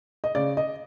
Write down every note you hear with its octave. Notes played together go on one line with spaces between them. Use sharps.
D#5
C#3 D5
D#5